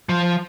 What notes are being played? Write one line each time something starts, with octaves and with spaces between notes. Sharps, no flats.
F3